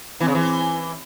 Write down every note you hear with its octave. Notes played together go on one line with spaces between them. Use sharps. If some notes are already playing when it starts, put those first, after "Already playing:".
E3 C4
C#3
E3